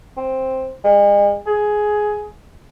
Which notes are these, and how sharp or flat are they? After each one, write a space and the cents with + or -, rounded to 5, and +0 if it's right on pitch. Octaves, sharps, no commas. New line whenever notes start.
C4 +5
G#3 -40
G#4 +10